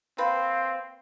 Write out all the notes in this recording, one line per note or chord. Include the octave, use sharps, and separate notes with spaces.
A#3 C4 B4 F5